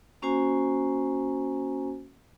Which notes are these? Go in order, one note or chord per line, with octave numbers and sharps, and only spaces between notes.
A#3 C#4 F#4 C5 G#5 A#5